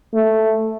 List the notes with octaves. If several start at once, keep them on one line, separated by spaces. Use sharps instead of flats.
A3